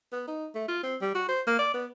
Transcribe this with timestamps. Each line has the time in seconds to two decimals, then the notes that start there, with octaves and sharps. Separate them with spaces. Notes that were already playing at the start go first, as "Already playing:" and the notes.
0.12 B3
0.28 D#4
0.55 A3
0.68 F4
0.83 C4
1.01 G3
1.15 F#4
1.29 C5
1.47 A#3
1.59 D5
1.74 B3